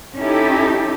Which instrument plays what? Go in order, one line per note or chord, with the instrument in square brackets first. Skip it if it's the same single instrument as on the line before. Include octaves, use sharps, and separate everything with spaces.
[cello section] C#4 D#4 E4 G4 A4